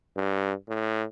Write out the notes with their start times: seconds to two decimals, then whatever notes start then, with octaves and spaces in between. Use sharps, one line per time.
0.17 G2
0.68 A2